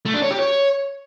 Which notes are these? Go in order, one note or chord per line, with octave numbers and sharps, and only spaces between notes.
A3
D4
C#5
G4
C#5